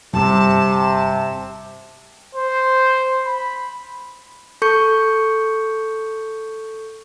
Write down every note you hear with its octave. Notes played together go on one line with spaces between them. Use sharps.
G1 C3 A5
C5
B5
A4 C#6 G6 C#7